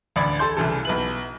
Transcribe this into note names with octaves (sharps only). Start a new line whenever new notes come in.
A1 D2 D5 B5 G#6
A4 A5 C6 G6
C2 C#3 E3 A4
B1 B4 F#7